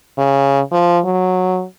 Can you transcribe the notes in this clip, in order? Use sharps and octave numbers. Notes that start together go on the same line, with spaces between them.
C#3
F3
F#3